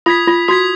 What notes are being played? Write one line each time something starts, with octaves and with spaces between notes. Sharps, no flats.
F4 D#6 G#6 B6
F4
F#4 D#6 G#6 B6